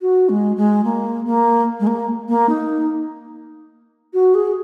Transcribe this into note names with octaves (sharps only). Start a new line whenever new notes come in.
F#4
G#3
G#3
A#3
A#3
G#3
A#3
A#3
D#4
F#4
G#4